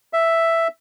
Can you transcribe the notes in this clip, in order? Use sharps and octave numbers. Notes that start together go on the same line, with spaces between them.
E5